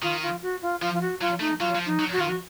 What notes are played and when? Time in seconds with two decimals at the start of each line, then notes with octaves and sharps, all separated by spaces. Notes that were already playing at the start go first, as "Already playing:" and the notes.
0.02 D#3 F4
0.22 F4
0.42 F#4
0.62 F4
0.81 F3 F4
0.94 F4
1.01 F#4
1.21 F#3 F4
1.40 A3 D#4
1.60 F#3 F4
1.75 F#3
1.79 F3
1.86 D#4
1.99 F#3
2.13 F#4
2.19 D#3 F4
2.29 F#4